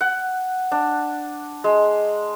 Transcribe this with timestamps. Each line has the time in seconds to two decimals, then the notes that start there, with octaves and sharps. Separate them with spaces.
0.01 F#5
0.72 D4
1.64 G#3